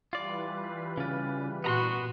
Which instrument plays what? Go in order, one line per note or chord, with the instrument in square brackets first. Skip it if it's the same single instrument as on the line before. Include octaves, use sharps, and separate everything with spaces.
[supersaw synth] E3 G3 B4 [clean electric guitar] F4 D5
[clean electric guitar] C#3 F4
[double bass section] A#2 [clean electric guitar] B3 A#5 C6 [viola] F#4